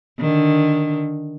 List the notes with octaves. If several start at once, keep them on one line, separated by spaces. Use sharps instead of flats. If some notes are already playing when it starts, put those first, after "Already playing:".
D3 D#3